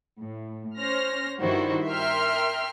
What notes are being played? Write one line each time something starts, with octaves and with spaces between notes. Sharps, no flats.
A2
C#4 C5 F6 A#6
G2 D#3 G3 E4 F#4 C5
A#4 E5 G5 C6 F6